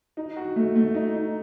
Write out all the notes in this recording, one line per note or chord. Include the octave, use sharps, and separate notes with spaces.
D#4
F#4
A3
A3
D#4
D#4